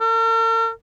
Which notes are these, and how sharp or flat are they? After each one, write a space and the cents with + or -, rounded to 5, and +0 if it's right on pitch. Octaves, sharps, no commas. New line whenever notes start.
A#4 -45